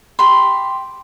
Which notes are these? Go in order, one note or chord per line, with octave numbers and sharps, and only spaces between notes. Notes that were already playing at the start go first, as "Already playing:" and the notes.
G4 B5 C6